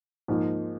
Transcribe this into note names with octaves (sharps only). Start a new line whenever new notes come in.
G#2 F3 A#3 D#4